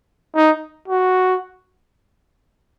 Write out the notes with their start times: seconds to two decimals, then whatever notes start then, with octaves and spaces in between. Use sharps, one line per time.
0.35 D#4
0.88 F#4